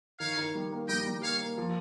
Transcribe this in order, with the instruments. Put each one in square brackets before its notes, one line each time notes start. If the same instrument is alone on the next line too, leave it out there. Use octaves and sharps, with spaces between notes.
[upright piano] D#3 [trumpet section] C#5 F5
[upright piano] D#3
G3
A#3
[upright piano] G3 [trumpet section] D#5 G5
[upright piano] G3
[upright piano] A#3 [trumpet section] C#5 F5
[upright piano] A#3
F3